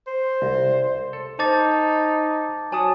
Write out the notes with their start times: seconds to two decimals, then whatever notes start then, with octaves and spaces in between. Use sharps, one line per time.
0.07 C5
0.42 C2
1.13 A4
1.39 D#4 C5 A5 D6 A6
2.72 F#3 C#5 G#5 A5 D#6